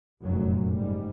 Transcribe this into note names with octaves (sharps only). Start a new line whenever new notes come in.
F1 F#2 A#2 F#3
G#2 G3